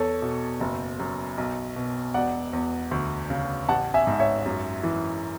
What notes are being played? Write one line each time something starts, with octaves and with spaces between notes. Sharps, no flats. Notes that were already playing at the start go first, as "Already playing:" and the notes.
Already playing: E2 A4 C#5
B2
F#1
F#2
B1
B2
E1 D5 F#5
E2
D2
C#3
A1 F#5 A5
E5 G#5
G#2
C#5 E5
F#2
E3